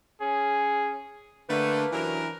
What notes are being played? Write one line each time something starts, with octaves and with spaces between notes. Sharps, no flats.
C#4 G#4
D3 A3 A#3 B4
F#2 C3 E3 F#3 D4 A#4